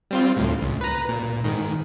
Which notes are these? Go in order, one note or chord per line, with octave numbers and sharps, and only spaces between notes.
G3 C4 F4
D2 A2
C#2
B4 A#5
A#2
G#2 D#3